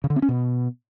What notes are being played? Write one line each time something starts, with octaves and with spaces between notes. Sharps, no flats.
C#3
D3
C4
C#4
B2